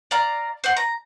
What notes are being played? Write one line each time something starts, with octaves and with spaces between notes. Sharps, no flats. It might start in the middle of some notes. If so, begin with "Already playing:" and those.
D5 F5 A#5
C5 F#5
A#5